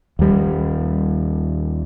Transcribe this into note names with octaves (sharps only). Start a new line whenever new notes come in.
D#2 G3